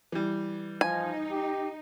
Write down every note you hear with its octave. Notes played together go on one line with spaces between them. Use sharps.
E3 G3
F3 D#4 G#5
G4